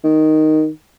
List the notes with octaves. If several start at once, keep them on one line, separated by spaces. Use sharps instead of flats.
D#3